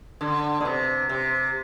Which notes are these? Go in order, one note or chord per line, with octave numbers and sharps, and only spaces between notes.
D3
B2
C3
C3